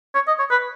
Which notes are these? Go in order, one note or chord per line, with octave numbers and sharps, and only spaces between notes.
C#5
D#5
C#5
B4